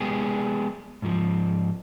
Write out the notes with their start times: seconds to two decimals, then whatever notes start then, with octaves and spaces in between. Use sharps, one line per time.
0.01 G#3 B3 G4 G#4
1.02 G#2 F3